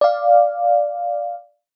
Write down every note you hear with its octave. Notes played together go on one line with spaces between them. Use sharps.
D5 F5